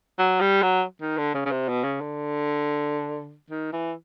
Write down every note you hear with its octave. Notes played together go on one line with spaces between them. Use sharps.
F#3
G3
F#3
D#3
D3
C#3
C#3
C3
B2
C#3
D3
D#3
E3